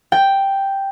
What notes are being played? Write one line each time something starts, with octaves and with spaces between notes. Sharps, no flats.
G5